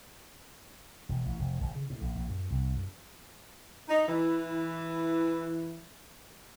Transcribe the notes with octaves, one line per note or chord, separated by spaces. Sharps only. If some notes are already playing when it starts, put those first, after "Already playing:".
E1
A1
F1
G#1
C#3
A2
A#1
A#1
F#2
C2
F#2
D#4
E3